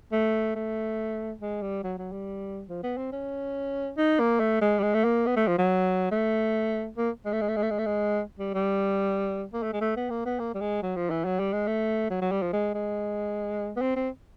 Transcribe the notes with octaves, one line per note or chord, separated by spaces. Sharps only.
A3
A3
G#3
G3
F#3
F#3
G3
F3
B3
C4
C#4
D#4
A#3
A3
G#3
G3
G#3
A3
A#3
B3
A3
F3
F#3
A3
A#3
G#3
A3
G#3
A3
G#3
A3
G#3
A3
G#3
G3
G3
A#3
A3
G#3
A3
B3
A#3
B3
A#3
G3
G#3
F#3
F3
E3
F#3
G3
G#3
A3
F#3
F#3
G3
F3
G#3
G#3
B3
C4
C4